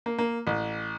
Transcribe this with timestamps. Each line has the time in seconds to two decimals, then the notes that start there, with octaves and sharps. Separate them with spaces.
0.06 A#3
0.19 A#3
0.47 A1